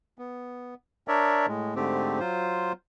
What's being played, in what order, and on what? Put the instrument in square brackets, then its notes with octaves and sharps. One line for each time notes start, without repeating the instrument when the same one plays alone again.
[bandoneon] B3
D4 A#4 C#5 D5 E5
A2 G#3
G#2 D3 A3 C4 G4
F#3 F4 C5